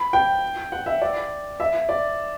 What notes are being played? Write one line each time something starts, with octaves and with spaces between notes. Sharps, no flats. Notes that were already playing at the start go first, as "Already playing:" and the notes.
Already playing: B5
G5
F#5
E5
D5
E5
D5